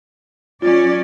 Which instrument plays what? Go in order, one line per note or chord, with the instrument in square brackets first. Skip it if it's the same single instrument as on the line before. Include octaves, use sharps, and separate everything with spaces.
[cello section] F#3 C#4 D5 [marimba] F4